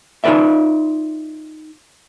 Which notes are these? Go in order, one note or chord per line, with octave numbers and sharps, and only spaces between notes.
D#4 F4 G#4 B4 D5 E5